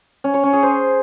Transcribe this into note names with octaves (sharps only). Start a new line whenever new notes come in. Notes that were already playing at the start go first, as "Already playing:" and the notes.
C#4
C#5
C#4
G#4
C5